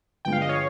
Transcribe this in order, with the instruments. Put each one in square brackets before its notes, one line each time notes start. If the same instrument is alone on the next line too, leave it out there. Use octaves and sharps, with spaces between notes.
[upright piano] G1 G2 F3 G#3 [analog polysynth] G5
[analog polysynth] F5
D#5
C#5 F5